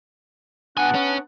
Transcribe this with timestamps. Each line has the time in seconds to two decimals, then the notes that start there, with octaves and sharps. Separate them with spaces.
0.77 B2 B3 D4 F#5 G#5
0.95 C#4